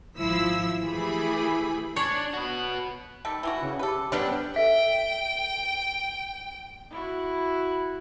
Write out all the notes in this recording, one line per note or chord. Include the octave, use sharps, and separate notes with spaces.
G#1 F3 E4 E6 B6
E3 A3 E4 G4 G#4 B5
D4 C#5
F#4 B4
D#3 G3 A4
E3 G3 E4 F#4
C#3
G4 A4 B4
G3 B3 C#4 D4 A4 G5
A4 E5 G5
E4 F#4